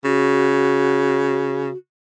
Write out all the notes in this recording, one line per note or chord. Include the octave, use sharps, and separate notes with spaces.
C#3 F#4